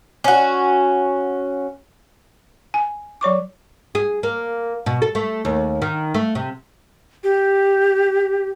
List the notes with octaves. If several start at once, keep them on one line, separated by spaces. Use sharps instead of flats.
C#4 F#4
G#5
F#3 C#5 C#6 D6
G#4
A#3
B2
A4
A3
D#2
D#3
A3
C3
G4